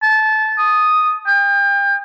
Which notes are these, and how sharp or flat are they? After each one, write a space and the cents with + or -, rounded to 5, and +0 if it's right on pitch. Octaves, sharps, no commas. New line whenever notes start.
A5 -20
D#6 +0
G5 +35